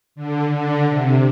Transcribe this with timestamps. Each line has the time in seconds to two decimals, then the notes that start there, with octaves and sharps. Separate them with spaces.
0.15 D3
0.52 D3
0.89 C3